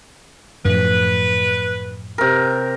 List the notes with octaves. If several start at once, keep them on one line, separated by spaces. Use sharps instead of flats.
F#2 A2 F3 B4
C3 A#4